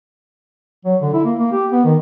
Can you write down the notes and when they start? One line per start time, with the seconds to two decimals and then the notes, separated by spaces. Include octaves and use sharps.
0.85 F#3
1.01 D3
1.13 E4
1.24 A#3
1.39 A#3
1.52 G4
1.72 B3
1.85 D#3